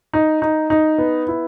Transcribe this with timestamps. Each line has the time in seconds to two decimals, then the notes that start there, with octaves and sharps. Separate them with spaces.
0.13 D#4
0.42 D#4
0.70 D#4
0.98 B3
1.28 E4